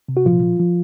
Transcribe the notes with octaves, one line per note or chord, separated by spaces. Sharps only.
C3
F#4
A#2 F3 F4
F3
F3